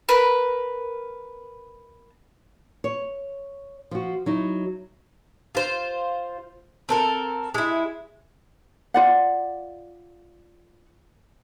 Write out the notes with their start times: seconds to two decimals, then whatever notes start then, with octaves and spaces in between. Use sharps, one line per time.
0.09 A#4 B4
2.84 C#5
3.91 F3 F#4
4.26 F#3 D#4 E4
5.55 F4 C5
6.89 C4 A4 A#4
7.54 G#3 E4
8.94 F4 D5 F#5